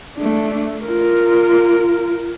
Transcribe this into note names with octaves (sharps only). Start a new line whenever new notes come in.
A3 D4
F4 A#4